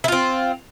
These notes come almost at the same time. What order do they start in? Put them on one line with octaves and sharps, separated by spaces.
E4 F4 C4